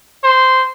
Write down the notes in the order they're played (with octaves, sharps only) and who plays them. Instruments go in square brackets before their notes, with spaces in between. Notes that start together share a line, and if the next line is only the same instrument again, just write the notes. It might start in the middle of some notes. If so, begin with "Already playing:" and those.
[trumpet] C5